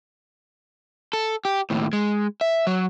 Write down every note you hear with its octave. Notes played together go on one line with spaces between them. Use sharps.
A4
G4
D#2 A2
G#3
E5
F#3